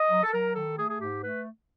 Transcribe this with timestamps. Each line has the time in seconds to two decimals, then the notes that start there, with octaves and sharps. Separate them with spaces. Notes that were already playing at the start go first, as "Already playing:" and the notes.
Already playing: D#5
0.10 F#3
0.23 A4
0.32 F#3 A#4
0.54 D#3 A4
0.78 A3 G#4
0.89 G#4
0.99 G#2 G4
1.21 A3 B4